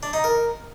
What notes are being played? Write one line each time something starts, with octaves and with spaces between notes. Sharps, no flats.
D4
D#4
A#4